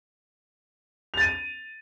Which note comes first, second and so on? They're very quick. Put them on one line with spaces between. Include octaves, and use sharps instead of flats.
F7 A6 D#7